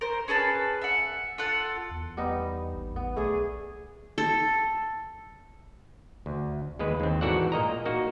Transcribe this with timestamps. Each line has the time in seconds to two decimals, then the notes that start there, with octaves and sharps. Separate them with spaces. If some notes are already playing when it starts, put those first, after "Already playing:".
0.01 A#4 C5
0.28 C#4 G#4 B4 A5
0.81 E5 F#5
1.38 F4 A4 F#5
1.91 E2
2.17 G3 B3 D#4
2.75 A1
2.96 B3
3.17 B1 A3 D4 G#4
4.18 A4
6.26 D2
6.79 D#2 G#3 B4
7.00 D#2 C4
7.21 G#2 E3 F#4 A4 D5 F#5
7.52 A#2 A#3 D#5 A#5
7.86 A#3 D#4 F#4